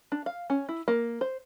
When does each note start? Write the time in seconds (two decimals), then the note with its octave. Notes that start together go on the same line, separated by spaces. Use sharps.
0.12 D4
0.26 F5
0.50 C#4
0.69 E4
0.88 A#3
1.21 C5